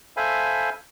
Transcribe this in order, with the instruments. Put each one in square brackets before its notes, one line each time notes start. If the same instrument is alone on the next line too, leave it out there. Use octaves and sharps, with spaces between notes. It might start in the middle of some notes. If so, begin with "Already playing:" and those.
[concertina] A4 C5 E5 F5 G#5 B5